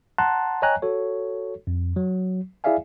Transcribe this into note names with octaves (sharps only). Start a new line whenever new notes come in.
F#5 A5 A#5 C6 F#6
C#5 D#5 G5 G#5 A#5 F#6
F#4 A4 C#5
F2
F#3
E4 G#4 D5 E5 F5 G#5